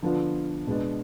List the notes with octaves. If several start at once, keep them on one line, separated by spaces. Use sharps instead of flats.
D3 F3 B3 D4 F4
B2 G#3 B3 D4